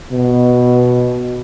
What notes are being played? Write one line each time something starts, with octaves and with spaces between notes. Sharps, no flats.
B2